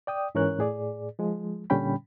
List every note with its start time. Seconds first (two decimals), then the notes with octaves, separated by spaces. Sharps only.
0.07 D5 G5 D#6
0.35 G#2 E3 C#4 A#4 C#5 F#6
0.59 A2 G#4 D5
1.19 F3 G#3
1.70 A#2 D3 G3 C#4 G5 B5